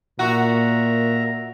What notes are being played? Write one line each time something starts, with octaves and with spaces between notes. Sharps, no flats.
A#2 F#4 A#4 E5 A#5